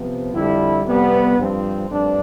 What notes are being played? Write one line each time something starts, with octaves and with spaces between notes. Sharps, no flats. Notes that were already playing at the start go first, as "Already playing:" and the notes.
Already playing: C3 F3 B3
F2 D3 G3 E4
F2 C3 G3 B3
G2 F3 C4
G2 F3 A3 C4 D4